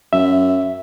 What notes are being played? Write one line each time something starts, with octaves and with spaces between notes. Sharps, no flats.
F#2 E5